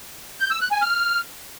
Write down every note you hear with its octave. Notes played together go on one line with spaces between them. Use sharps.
G6
E6
F#6
G#5
F6